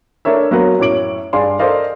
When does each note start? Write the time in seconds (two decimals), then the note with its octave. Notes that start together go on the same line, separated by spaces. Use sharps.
0.25 A3 D4 A#4 C#5 E5
0.51 F#3 A#3 B3 F#4 B4 C5
0.79 F#2 A2 C#5 D6 D7 F#7
1.33 G2 D4 G#4 D5 F5 C6
1.59 A4 A#4 C5 D5 D#5 F5